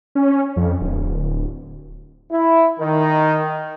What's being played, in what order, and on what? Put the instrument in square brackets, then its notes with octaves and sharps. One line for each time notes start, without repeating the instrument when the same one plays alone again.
[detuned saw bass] C#4
F2
D1
[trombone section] E4
D#3